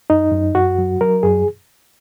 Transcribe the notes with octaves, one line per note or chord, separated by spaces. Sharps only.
F#2 D#4
F#2
F#2 F#4
F#3
F#3 A#4
F#2 G#4